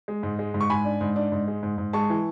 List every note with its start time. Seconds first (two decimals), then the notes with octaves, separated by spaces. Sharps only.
0.08 G#3
0.23 G#2
0.39 G#3
0.54 G#2
0.61 C#6
0.69 G#2 G#5 B5
0.85 D4
1.01 G#2
1.16 D4
1.32 G#2
1.48 G#3
1.63 G#2
1.78 G#2
1.93 G#3 A5 C#6
2.10 E3